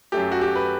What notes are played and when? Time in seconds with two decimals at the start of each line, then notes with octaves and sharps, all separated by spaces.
0.12 F#2 F#3 A3 G4
0.32 F#4
0.41 G4
0.55 B4